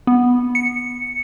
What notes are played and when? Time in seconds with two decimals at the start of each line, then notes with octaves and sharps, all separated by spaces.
0.07 B3
0.55 C#7